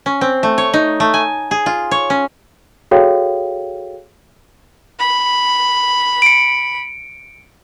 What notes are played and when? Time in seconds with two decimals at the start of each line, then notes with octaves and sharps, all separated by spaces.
0.06 C#4
0.21 C4
0.43 A3
0.58 C#5
0.73 D#4
1.00 A3
1.14 G#5
1.51 G#4
1.66 F4
1.91 C#5
2.10 C#4
2.91 F#4 G#4 A4 C#5 F5 G5
5.00 B5
6.22 C#7 D7